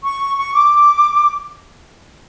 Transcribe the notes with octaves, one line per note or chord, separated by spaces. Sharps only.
C#6
C#6
D6